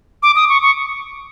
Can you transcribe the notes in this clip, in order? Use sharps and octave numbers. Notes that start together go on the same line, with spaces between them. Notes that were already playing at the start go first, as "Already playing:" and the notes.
D6
D#6
C#6
C#6